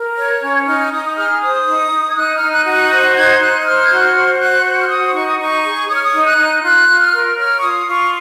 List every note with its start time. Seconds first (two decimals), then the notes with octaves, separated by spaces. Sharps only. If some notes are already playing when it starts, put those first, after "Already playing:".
Already playing: A#4
0.17 C#5
0.42 C#4
0.66 D#4 F6
0.91 D#4 D#6
1.06 D#6
1.16 G#4 F6
1.41 C5 D#6
1.66 D#4
1.91 D#4
2.08 G#6
2.15 D#4 F#6
2.35 F6
2.41 D#4
2.53 F#6
2.66 F#4
2.72 F#6
2.90 C5 F#6
3.15 D#4 G#6
3.39 D#4 F#6
3.60 F#6
3.64 C5 F6
3.84 G#6
3.89 F#4 F#6
4.01 F6
4.14 C5
4.35 F6
4.39 F#4 F#6
4.63 C5 F#6
4.81 F6
4.89 F#4 D#6
5.14 D#4 C#6
5.26 D#6
5.38 D#4 C#6
5.63 G#4
5.88 C#5 D#6
5.95 F6
6.03 D#6
6.13 D#4
6.25 F#6
6.37 D#4
6.63 F4 F#6
6.87 F4
7.00 F6
7.12 A#4
7.37 C#5 F6
7.56 C#6
7.62 F4 D#6
7.86 F4 C#6